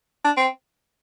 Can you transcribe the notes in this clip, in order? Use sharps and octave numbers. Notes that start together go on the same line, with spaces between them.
D4
C4